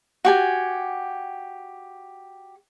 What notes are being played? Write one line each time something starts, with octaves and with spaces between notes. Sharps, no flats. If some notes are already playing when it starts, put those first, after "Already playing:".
F#4 G4 G#5